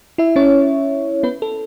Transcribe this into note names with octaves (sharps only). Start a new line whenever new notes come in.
E4 E5
C#4 C#5
B3 B4
A4